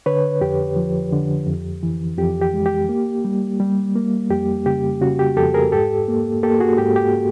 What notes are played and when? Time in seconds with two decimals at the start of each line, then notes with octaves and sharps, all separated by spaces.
0.06 D3 B4 C#5
0.41 F2 G4
0.76 F3
1.12 D3
1.47 F2
1.83 E3
2.18 F2 G4
2.42 G4
2.54 G#3
2.66 G4
2.89 A#3
3.25 G3
3.60 G3
3.95 A#3
4.30 F2 G4
4.66 C#3 G4
5.01 C#3 F#4
5.19 G4
5.37 F2 G4 A4
5.54 G#4 A#4
5.72 G#2 G4 A4
6.08 A#3
6.43 A#3 G4 A4
6.60 F#4 G#4
6.78 G#2 G4
6.96 G4